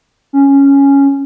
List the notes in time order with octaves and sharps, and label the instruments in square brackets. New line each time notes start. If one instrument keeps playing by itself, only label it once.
[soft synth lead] C#4